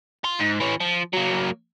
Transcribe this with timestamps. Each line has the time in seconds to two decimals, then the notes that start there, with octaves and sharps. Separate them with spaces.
0.24 F5 C6
0.39 G#2
0.60 E3 C#4
0.80 F3
1.13 F#3 A#3